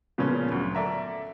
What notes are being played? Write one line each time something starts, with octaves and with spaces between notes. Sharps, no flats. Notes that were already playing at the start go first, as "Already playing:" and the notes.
A#2 C#3 F3 B3 C#4
D2 F#3
A4 D5 E5 A#5